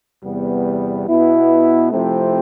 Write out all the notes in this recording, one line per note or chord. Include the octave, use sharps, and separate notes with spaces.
E2 C3 G3 B3
B2 B3 E4
C3 F3 A3 C4 E4